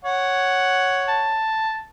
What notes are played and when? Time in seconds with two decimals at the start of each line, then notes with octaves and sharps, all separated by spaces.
0.05 C#5 F#5
1.08 A5